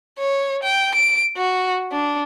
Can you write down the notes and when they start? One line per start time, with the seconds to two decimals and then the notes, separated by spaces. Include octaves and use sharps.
0.19 C#5
0.63 G5
0.95 D7
1.37 F#4
1.92 D4